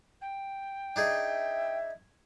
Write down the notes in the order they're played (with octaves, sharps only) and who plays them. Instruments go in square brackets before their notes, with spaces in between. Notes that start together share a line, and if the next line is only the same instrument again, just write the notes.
[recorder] G5
[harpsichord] D4 D#4 G#4 [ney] E5